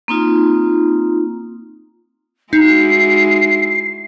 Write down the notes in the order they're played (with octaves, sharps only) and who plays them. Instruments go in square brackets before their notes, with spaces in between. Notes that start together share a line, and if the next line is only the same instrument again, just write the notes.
[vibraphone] A#3 C4 D#4 F4
[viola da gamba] G#3 E4 F#4 [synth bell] D#4 [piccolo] C7